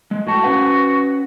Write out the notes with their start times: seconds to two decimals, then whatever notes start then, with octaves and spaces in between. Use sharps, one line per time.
0.11 G#3
0.27 A2 F#4 A5
0.44 C#4 B4 F#5